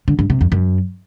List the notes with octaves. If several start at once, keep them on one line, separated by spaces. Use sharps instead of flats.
D3
G2
C3
F2
F#2